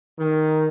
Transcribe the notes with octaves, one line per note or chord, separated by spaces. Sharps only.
D#3